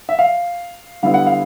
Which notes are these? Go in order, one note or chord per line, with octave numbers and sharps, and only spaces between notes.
E5
F5
D3 G3 B3 E4 F5
F#5
F5